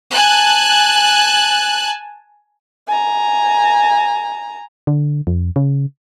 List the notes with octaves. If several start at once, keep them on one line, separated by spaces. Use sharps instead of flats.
G#5 A5 F#6
G#5 A#5
D3
F2
C#3